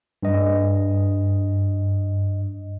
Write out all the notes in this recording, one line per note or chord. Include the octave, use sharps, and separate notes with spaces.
G2 D#5